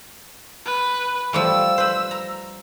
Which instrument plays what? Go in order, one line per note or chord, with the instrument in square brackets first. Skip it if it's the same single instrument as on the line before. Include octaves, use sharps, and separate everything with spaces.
[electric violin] B4
[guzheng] F3 G3 A3 [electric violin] E6
[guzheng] B4 C5
A#5